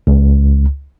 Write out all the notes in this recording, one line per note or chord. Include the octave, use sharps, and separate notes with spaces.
C#2